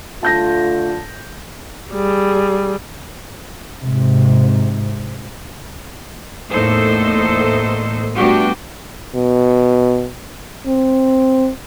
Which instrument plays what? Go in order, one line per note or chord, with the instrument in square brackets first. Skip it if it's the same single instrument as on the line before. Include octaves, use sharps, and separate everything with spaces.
[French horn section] D3 A3 F4 [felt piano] A5 G6 A#6
[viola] G3 G#4
[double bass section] G#2 C3
[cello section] E2 A2 A#3 D#4 A4 C5
G3 A3 B3 D4 F#4 G4
[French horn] B2
C4